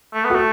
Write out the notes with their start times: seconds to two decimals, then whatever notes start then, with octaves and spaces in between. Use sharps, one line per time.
0.14 A3
0.25 B3
0.30 A3 F#4 A4